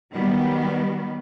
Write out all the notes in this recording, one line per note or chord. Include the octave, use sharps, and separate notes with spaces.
D#3 F#3 G3 B3